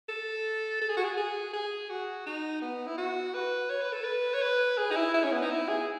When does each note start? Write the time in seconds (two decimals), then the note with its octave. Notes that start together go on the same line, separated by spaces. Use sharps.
0.09 A4
0.81 A4
0.89 G#4
0.97 F#4
1.04 G#4
1.17 G#4
1.53 G#4
1.89 F#4
2.26 D#4
2.62 B3
2.87 E4
2.97 F#4
3.34 B4
3.70 C#5
3.81 B4
3.93 A4
4.04 B4
4.34 C#5
4.42 B4
4.78 G#4
4.91 D#4
4.96 E4
5.14 E4
5.24 C#4
5.32 B3
5.42 D#4
5.50 E4
5.68 G#4